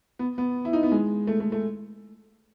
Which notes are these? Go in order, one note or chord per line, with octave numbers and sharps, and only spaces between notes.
B3
B3
E4
D#4
B3
G#3
A3
A3
A3